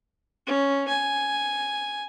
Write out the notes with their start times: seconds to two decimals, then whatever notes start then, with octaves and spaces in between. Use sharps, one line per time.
0.47 C#4
0.88 G#5